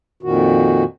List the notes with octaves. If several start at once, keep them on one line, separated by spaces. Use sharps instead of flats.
F2 A#2 D#3 F#4